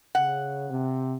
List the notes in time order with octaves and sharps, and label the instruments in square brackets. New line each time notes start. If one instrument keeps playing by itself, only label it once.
[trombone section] C#3 [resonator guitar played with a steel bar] F#5
[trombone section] C3